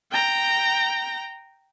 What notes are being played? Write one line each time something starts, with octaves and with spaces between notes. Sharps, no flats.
G5 A#5